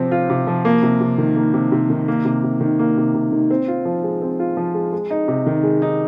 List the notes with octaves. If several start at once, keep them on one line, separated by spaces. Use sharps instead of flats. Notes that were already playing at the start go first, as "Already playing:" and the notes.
Already playing: C3 F3 C4
F4
C3
F3
A#3
C3
C3
D#3
A#3
C3
C3
D#3
A#3
C3
C3
D#3
A#3
C3
C3
D#3
C4
F4
F3
G#3
C4
F4
F3
G#3
G#3
D#4
C3
D#3
G#3
D#4